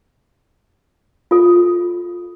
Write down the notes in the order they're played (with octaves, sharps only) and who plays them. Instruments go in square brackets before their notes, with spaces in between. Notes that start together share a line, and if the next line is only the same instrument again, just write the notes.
[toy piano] F4 A4